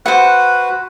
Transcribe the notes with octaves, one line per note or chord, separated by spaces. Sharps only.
F#4 B4 C5 F#5